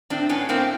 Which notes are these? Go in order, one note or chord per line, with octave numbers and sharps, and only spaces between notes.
A2 C4 D4
A2 B3 C#4
A2 A#3 C4